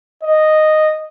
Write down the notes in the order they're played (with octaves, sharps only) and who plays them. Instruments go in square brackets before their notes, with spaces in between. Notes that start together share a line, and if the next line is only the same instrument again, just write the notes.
[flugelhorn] D#5